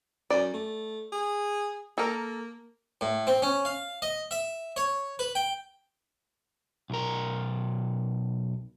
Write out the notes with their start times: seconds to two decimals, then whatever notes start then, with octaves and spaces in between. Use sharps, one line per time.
0.31 F#2 D5
0.54 A3
1.12 G#4
1.98 A#3 A4 A#4
3.01 A2
3.27 C4
3.42 C#4
3.65 F5
4.02 D#5
4.31 E5
4.76 C#5
5.19 B4
5.35 G5
6.90 B1 A#4